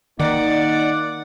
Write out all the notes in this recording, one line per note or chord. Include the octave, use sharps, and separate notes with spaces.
D#3 A#3 D#4 D5 F#5 D6